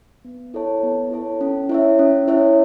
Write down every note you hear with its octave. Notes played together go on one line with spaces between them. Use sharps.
B3
E4 A4 C#5 A5
B3
E4 A4 C#5 A5
C#4
E4 C#5 E5
C#4
E4 C#5 E5